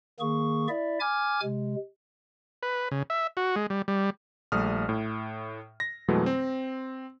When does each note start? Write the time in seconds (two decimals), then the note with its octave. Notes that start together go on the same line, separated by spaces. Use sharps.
0.20 D#3 A#3 G#4 C#6
0.69 E4 D5 E5
1.00 G#5 D6 F6 G#6
1.43 C3 G#3
2.63 B4
2.91 C#3
3.10 E5
3.37 F#4
3.56 G#3
3.70 G3
3.88 G3
4.52 A#1 G3 A3 D#6 F6
4.89 A2
5.80 A#6
6.08 F2 B2 E3 F#3 G#3 A3
6.26 C4